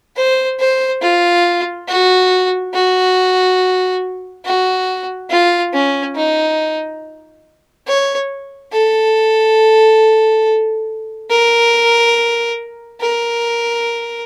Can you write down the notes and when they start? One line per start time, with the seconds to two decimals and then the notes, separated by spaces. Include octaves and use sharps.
0.16 C5
0.59 C5
1.02 F4
1.88 F#4
2.74 F#4
4.45 F#4
5.30 F4
5.73 C#4
6.16 D#4
7.87 C#5
8.72 A4
11.30 A#4
13.01 A#4